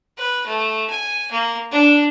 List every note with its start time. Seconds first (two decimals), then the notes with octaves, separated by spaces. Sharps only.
0.18 B4
0.47 A3
0.90 G#5
1.32 A#3
1.72 D4